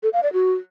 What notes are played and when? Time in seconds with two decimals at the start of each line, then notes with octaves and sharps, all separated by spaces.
0.03 A4
0.13 F5
0.23 D5
0.33 F#4